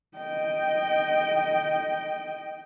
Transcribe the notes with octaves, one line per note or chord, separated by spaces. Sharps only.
D#5 G5